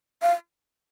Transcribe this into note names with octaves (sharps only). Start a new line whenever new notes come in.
F5